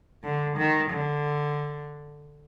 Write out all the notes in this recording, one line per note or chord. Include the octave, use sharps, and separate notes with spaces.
D3
D#3
D3